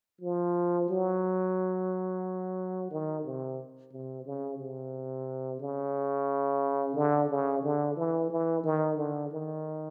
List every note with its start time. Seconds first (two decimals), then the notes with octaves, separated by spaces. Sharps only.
0.21 F3
0.89 F#3
2.91 D#3
3.25 C3
3.91 C3
4.26 C#3
4.59 C3
5.60 C#3
6.95 D3
7.29 C#3
7.63 D3
7.96 E3
8.30 E3
8.63 D#3
8.97 D3
9.31 D#3